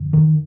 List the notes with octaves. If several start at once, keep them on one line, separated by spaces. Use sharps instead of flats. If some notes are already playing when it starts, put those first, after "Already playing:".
Already playing: F2 D3
D#3